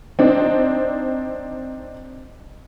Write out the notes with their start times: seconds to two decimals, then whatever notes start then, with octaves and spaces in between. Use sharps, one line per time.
0.19 C4 D4 D#4